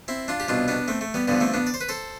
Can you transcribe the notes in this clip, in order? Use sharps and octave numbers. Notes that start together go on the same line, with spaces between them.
C4 E4
D4 F4
G4
C2 B2 D4 F4
B3 D4
A3 C4
A3
G3 B3
G2 D3 F3 G3 B3
A3 C4
B3 D4
D5
C5
B4
A4 C5